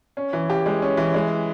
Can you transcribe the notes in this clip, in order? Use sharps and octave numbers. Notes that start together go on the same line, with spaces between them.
C#4
E3
G4
G#3
C#4
E3
G#3